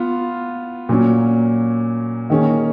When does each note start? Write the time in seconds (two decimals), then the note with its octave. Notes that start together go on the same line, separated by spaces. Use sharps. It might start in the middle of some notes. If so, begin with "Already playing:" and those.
Already playing: B3 F4
0.89 A#2 F#3 C#4
2.30 D#3 A#3 C#4 G#4